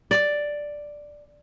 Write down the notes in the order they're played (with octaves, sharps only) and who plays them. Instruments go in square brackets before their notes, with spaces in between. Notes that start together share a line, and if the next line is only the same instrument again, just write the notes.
[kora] D5